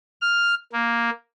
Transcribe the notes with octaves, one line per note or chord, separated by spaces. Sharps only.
F6
A#3